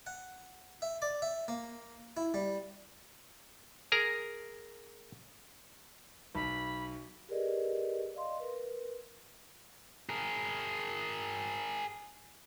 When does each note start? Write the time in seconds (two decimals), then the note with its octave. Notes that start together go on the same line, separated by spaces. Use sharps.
0.07 F#5
0.82 E5
1.02 D5
1.22 E5
1.48 A#3
2.17 E4
2.34 G3
3.92 G#4 A#4 A#5
6.35 B1 B5
7.29 G4 G#4 A#4 B4 D5 D#5
8.14 D5 D#5 F5 C6
8.40 A#4 B4
10.09 G#4 A#4